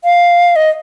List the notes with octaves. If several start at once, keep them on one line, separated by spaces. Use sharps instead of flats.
F5
D#5